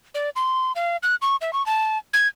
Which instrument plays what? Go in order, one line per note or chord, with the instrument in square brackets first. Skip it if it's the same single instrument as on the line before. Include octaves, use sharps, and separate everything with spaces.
[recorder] D5
C6
F5
F#6
C#6
E5
C#6
A5
G#6